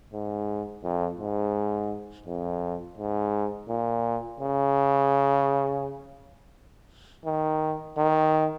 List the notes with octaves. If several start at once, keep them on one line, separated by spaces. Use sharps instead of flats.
G#2
F2
G#2
F2
G#2
A#2
C#3
D#3
D#3